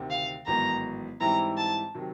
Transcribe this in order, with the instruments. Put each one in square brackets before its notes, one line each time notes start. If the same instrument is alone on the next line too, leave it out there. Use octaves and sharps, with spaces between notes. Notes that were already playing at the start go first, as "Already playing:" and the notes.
Already playing: [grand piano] D2 C3 D#3
[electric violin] F5
[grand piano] A1 G#2 D#3 F#3 B3 [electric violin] A#5
[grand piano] G#2 E3 G3 C4 E4 [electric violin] A#5
[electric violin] A5
[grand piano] C3 D#3 F#3